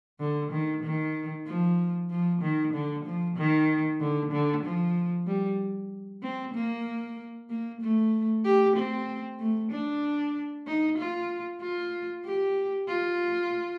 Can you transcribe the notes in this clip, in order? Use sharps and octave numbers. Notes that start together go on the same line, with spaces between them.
D3
D#3
D#3
F3
F3
D#3
D3
F3
D#3
D3
D3
F3
G3
C4
A#3
A#3
A3
G4
C4
A3
D4
D#4
F4
F4
G4
F4